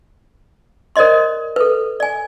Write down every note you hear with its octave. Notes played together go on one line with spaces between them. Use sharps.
A#4 C5 D5 D#5 C6
A4 B4
D5 G#5